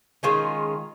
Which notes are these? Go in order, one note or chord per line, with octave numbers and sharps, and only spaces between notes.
D#3 G#3 C#4 F4